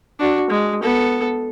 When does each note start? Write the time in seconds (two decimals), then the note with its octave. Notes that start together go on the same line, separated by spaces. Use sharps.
0.19 D4 F#4
0.50 G#3
0.82 B3 A4